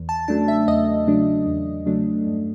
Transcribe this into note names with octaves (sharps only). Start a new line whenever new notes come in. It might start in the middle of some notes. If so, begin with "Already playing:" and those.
Already playing: E2
A5
C#3 F#3 A3 D4 A5
E5
E2 D#5
C#3 F#3 A3 D4
E2
C#3 F#3 A3 D4
G2